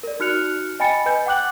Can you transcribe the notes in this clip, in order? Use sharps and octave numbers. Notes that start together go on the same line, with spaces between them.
A#4 D5
D#4 F#4 F6 F#6 C#7 F7
D#5 G5 G#5 B5 A6 C#7
B4 D#5 G#5 G6
F#5 G5 D6 F#6 F#7